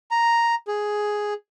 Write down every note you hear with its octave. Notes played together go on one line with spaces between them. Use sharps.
A#5
G#4